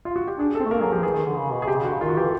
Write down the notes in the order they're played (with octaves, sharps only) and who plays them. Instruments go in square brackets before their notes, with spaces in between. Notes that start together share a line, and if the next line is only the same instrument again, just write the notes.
[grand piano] F4
F#4
G4
[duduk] D4 [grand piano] G#4
[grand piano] A4
[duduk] C4
A3
[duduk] A#3 [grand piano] A#4
[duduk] F#3 [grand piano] G#4
[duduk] F3 [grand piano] G4
[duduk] E3 [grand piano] G#4
[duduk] D#3
D3
C#3
B2
[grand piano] G#4
[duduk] C3 [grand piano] G4
[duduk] C#3
[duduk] D3 [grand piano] F#4
[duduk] C#3
[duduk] D#3 [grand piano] F4
[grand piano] F#4
[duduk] E3 [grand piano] G4
[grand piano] A4